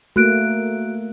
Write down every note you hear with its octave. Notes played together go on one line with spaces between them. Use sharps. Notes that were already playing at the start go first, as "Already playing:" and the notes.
A3 A#3 F#4 F#6 D7